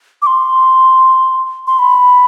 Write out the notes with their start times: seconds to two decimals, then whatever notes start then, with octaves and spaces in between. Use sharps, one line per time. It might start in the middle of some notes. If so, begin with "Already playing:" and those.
0.22 D6
0.27 C6
1.67 C6
1.79 B5